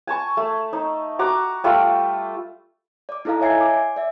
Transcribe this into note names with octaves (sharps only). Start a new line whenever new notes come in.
G#5 A5 C#6
A3
D#4
F#4 A#5 D6
G3 A3 F4
D5 D6
D#4 E4 A4 D#5 F5 A#5
C#5 E5 G#5 G#6 C7
D6
D5 E5